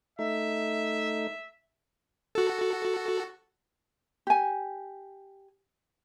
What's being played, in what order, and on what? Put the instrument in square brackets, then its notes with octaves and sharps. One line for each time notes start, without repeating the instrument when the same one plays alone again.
[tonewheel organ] A3 D#4 [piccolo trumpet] E5
[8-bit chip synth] F#4 A4
[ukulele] G4 G#5